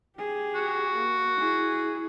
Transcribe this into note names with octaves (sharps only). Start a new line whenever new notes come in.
G4 G#4
F#4
A#3
E4 G#4